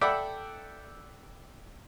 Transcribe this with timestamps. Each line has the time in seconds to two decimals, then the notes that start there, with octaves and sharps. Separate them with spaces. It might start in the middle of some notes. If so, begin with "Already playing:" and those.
0.01 A4 D5 E5 F#5 G5 B5